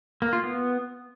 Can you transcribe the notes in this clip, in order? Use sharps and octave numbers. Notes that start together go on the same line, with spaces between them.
A#3
F4
B3